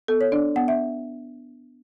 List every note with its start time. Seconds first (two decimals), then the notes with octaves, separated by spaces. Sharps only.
0.08 B3 A4
0.21 C#5
0.32 D4 D5
0.56 B3 F#5
0.68 E5